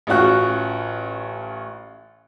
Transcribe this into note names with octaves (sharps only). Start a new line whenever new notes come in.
A1 C#4 F4 F#4 F#6